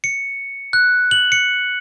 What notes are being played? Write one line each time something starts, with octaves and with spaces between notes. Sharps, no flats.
C#7
F#6
F#7
C#7